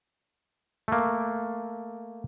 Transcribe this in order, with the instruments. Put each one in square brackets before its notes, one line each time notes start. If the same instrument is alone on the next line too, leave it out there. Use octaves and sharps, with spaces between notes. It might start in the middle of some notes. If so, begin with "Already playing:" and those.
[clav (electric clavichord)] A3 A#3